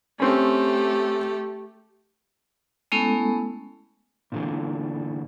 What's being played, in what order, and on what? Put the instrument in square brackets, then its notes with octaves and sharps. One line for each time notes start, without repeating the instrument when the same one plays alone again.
[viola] A3 G4 [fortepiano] C4 C#4
[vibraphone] G#3 A3 B3 C#4 E4 A4
[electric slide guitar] A#2 D3 E3